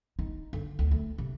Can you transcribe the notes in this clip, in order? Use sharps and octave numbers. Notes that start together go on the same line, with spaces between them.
D#4
D3
D2
A3
C3